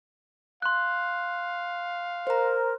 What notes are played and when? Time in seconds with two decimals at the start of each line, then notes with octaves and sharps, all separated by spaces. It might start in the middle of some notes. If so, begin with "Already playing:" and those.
0.62 F5 C6 F#6
2.27 A#4 C5 A#5